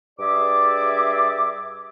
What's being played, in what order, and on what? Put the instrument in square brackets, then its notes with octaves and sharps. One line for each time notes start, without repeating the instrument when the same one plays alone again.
[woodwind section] G2 G#4 D5 E5 D6